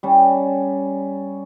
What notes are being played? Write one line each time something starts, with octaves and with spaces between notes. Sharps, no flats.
G3 C#4